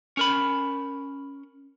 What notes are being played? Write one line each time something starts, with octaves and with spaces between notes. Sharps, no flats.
C#4 A#4 B5